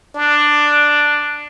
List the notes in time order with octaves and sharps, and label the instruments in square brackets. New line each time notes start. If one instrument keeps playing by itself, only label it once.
[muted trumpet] D4